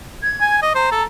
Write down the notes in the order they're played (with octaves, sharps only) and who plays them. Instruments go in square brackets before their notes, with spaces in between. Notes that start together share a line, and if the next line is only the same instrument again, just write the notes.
[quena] G#6
[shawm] G#5
[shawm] D#5 [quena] D6
[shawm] C5 [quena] A#5
[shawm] A4